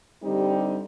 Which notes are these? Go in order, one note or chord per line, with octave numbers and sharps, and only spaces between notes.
D3 G3 C4 D#4 G4